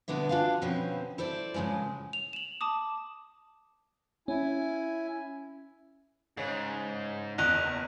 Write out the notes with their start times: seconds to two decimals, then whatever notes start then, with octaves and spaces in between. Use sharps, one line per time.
0.08 B2 D3 B3 D4 E4
0.29 D4 F4 F#4 G#4 F5
0.62 B2 F3 C4 C#4 B4
1.18 E4 A4 C5 D5
1.54 A2 C#3 E3 F3 G#3
2.13 F7
2.33 E7 F#7
2.61 A5 D6 D#6
4.28 C#4 E4 G#5
6.37 G#2 C#3
7.38 F#1 E2 D#5 A#5 F#6